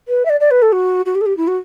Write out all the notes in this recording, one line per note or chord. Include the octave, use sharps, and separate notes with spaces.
B4
E5
D5
D5
B4
A4
F#4
F#4
G4
A4
G4
E4
F#4